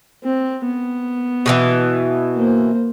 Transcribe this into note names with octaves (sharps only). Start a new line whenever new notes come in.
C4
B3
B2 D#3 E3
A#3 C5